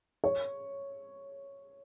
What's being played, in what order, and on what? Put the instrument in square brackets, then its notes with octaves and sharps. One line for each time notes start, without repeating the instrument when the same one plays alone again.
[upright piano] C#5